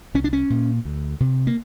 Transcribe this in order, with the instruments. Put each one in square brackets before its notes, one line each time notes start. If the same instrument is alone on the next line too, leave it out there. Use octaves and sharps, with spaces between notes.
[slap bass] C2 C#4
D4
C#4
A#2
D2
C3
A#3